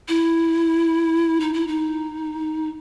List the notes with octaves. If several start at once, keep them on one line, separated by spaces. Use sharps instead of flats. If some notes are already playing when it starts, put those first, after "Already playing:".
E4
D#4
E4
D#4